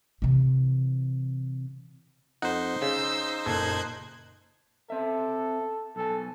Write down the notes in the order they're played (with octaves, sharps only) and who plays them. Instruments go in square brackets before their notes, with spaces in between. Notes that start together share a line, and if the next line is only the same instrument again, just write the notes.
[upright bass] C3 E3
[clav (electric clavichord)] F2 F#5 [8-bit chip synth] D#4 C5
[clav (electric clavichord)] C#3 [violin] E6 G6
[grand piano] F#1 A#2 A4 [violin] F#6 G#6
[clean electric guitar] C4 E5 [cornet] A4
[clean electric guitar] B1 G#5 [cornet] A4